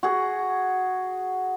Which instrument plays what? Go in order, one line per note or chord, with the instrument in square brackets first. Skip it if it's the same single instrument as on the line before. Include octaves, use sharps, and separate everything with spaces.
[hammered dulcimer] F#4 G#4